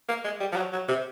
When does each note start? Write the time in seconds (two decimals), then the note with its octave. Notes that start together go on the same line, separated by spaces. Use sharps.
0.08 A#3
0.24 G#3
0.40 G3
0.52 F3
0.56 F#3
0.72 F#3
0.88 C3